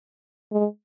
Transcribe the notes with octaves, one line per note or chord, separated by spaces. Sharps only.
G#3